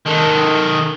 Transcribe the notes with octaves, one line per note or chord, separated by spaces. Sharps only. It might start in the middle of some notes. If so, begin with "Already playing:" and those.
D#3 A4